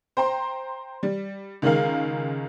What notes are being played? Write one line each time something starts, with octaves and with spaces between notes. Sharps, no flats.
C5 G5 A#5 C6
G3
C#2 D#3 G#3 A#4 F5